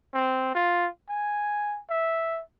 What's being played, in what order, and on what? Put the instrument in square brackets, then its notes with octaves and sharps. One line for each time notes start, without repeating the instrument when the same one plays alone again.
[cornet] C4
F4
G#5
E5